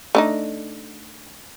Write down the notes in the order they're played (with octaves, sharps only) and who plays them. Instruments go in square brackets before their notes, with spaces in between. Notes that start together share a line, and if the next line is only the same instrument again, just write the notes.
[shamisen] A3 D4 D#4